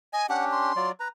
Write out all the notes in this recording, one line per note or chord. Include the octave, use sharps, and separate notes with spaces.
D#5 G#5
C#4 D4 G4 F#5
C6
F#3 F4 D5
B4 A#5